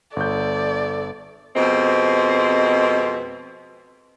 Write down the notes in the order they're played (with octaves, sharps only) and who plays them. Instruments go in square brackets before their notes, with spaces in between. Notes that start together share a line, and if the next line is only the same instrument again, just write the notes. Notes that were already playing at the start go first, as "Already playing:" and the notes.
[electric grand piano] G1 G6 [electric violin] A4 [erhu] D5
[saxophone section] F2 B2 G#3 C4